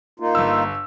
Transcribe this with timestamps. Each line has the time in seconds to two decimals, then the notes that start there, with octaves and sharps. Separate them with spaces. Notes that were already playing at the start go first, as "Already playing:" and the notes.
0.20 A#3 D#4 F4
0.35 G1 E6